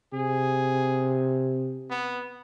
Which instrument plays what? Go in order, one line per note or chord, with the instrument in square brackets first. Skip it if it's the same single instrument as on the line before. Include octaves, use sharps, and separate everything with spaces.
[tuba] C3 [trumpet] G#4
[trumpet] B3